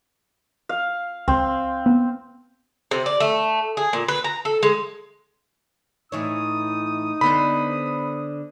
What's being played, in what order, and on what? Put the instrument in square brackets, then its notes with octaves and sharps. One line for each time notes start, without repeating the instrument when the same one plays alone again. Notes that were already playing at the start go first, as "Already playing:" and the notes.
[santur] F5
[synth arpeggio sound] C#2 [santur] C4
[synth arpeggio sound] B3
[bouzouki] C3
D5
A3
G#4
A#2
B4
A#5
A4
G#3
[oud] A2 E3 C#5 [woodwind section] D#4 [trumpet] D#6
[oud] D3 B3 C5 [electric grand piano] B5